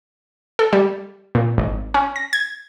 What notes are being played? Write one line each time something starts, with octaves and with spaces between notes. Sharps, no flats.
A4
G3
A#2
G#1
C#4
A#6
G#6